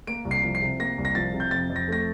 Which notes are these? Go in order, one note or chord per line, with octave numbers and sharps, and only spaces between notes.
A#3 D7
C2
C7
F3
C7
C3
A#3 A#6
C2
A#6
F3 A6
C3
G6
F2 A6
F2
A#6
A3 A#6